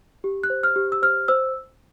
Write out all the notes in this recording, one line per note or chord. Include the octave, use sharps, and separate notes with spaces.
G4
F#6
C5
F6
G4
E6
C5 F6
C5 E6